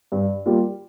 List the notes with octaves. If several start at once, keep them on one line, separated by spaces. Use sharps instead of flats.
G2
G3 A#3 F4